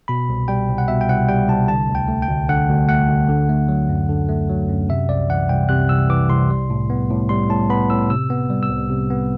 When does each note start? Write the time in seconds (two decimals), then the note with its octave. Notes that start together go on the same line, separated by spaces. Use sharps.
0.08 B2 B5
0.29 C2
0.48 G3 G5
0.68 C2
0.78 F#5
0.88 B2 E5
1.01 G5
1.09 C2 F#5
1.29 G3 G5
1.48 C2 A5
1.68 D3 A5
1.89 D2
1.95 G5
2.08 A3
2.22 G5
2.29 D2
2.49 D3 F#5
2.69 D2
2.89 A3 F#5
3.09 D2
3.28 D3
3.49 A3
3.68 F#3
3.89 F#2
4.09 D3
4.29 A3
4.50 F#3
4.69 F#2
4.89 C3 E5
5.09 C2 D5
5.29 E3 F#5
5.49 C2 G5
5.69 C3 F#6
5.89 C2 E6
6.09 E3 D6
6.29 C2 C6
6.50 G3
6.70 A2
6.90 B3
7.10 A2
7.29 G3 C6
7.49 A2 A5
7.70 B3 B5
7.90 A2 E6
8.10 C3 E6
8.30 B3
8.50 G3
8.63 E6
8.70 C2
8.90 C3
9.10 B3